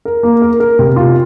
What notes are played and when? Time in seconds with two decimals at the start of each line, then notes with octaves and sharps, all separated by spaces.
0.05 A#4
0.23 A#3
0.42 A#4
0.60 A#4
0.79 C3
0.96 F4